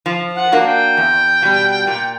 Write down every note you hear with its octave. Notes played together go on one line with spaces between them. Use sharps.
F3
F#5
A#3 D4 F#4
G5
E2
B2 G3
A#2